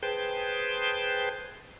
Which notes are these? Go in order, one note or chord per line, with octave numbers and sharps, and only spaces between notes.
G#4 B4 C5 G5 A5 C6